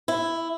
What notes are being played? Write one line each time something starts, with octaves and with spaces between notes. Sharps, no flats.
E4